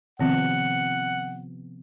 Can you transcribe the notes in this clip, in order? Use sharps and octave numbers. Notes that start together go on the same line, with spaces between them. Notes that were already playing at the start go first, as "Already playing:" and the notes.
C3 D#3 F3 B3 C4 F#5